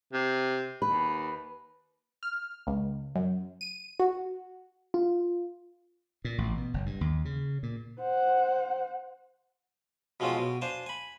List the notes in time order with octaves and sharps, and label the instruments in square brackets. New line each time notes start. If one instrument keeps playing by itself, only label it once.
[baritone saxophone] C3
[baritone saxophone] D#2 [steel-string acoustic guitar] B4
[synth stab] F6
C#2
F#2
D#7
F#4
[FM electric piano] F4
[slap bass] A#2
A1
B2
F#1
G2
D#2
C#3
A#2
[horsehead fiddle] C5 F#5
[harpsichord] B2 F3 G#3 C4 C#4 F4
B2
D4 C5 F5 G#5
G#5 B5